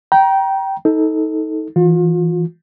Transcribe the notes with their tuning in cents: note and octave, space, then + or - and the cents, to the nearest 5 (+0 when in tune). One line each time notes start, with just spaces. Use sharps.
G5 -15 A#5 +30
D#4 +25 A4 +0
E3 +0 F4 +40